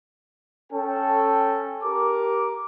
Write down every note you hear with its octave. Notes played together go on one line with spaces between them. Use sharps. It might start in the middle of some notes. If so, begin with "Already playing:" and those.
C#4 A4 G5
G4 A#4 D6